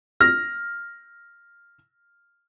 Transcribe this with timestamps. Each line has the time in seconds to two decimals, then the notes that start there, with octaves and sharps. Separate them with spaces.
0.21 F6 A#6